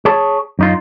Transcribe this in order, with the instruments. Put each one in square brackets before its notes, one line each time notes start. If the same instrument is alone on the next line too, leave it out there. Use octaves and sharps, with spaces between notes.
[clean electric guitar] G#4 C#5 A5
F#2 D#4 F4